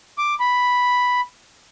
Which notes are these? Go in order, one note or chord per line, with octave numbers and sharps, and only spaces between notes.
D6
B5